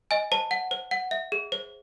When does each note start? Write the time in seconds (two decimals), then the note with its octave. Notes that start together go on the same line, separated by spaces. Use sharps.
0.11 D#5 G#5
0.32 C5 A5
0.51 F#5
0.71 C5
0.91 F#5
1.11 E5
1.32 G#4
1.52 C5